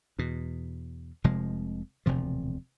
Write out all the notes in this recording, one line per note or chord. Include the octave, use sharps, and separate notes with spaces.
E2 B2
F1 C3 F3 G#3
E1 D2 C3 F3